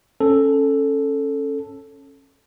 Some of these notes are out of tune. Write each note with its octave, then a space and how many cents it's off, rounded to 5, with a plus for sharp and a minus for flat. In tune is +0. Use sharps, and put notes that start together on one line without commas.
C#4 -15 A4 +0